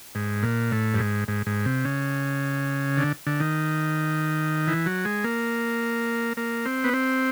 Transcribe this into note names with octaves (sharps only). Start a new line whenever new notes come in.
G#2
A#2
A2
G2
G#2
G#2
G#2
C3
C#3
D3
D3
D#3
E3
F#3
G#3
A#3
A#3
C4
B3
C4